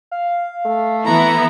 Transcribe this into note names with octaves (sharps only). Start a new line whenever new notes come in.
F5
A3
E3 B3 E4 A#5